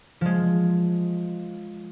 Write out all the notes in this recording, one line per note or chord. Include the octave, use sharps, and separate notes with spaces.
F3 G#3